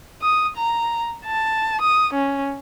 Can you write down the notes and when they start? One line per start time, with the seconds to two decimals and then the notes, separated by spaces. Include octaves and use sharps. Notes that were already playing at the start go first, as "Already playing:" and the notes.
0.22 D#6
0.57 A#5
1.25 A5
1.81 D#6
2.13 C#4